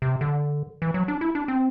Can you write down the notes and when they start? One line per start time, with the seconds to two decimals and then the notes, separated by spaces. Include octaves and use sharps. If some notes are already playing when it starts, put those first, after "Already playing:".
0.02 C3
0.21 D3
0.82 E3
0.94 F#3
1.08 D4
1.21 E4
1.35 D4
1.48 C4